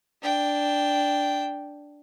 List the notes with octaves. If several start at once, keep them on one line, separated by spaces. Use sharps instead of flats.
D4 G5